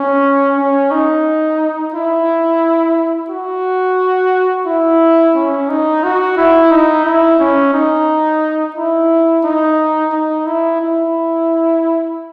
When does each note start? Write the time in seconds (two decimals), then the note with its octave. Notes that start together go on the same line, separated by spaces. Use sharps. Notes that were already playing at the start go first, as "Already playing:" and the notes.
Already playing: C#4
0.58 C#4
0.91 D#4
1.93 E4
3.30 F#4
4.66 E4
5.35 C#4
5.69 D#4
6.04 F#4
6.37 E4
6.71 D#4
7.05 E4
7.39 C#4
7.74 D#4
8.76 E4
9.44 D#4
10.12 D#4
10.46 E4
10.81 E4